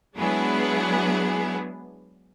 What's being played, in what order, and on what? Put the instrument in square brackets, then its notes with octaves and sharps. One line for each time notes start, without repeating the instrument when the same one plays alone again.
[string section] F#3 G#3 B3 D4 E4 G#4